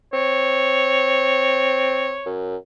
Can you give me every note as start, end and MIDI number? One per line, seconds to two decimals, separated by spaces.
0.13 2.18 60
0.13 2.40 73
2.26 2.56 42